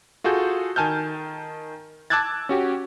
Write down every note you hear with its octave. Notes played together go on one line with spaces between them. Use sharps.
F4 F#4 G#4 A4 G6
D#3 G#5 A5 F6 G6
A5 D6 E6 F#6 G#6 A6
C#4 F#4 G4